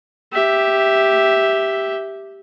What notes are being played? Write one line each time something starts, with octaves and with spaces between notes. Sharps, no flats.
G4 E5